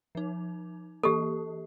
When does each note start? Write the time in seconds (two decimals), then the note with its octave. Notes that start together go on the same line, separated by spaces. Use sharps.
0.15 F3 D#4
1.03 E3 A#3 G4 A4